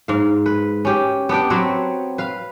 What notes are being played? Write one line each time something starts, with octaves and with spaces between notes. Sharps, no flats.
G#2 F5
B4
C#4 G4
B3 D4 G4 G5
F#3 C4 B4 C#5
B4 F5